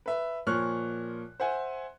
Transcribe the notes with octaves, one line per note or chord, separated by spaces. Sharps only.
B4 E5
A#2 F3 C#5 C#6 F6 F#6
C5 E5 F#5 G#5